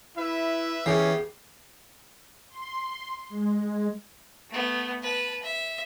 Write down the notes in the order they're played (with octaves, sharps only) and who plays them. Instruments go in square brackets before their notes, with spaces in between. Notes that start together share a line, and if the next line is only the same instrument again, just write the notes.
[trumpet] E4 [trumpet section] B4 E5
[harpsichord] E3 [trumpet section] B3 G4 [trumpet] C#4 [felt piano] G#4 C7
[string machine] C6
G#3
[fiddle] A3 B3
B4 A5
E5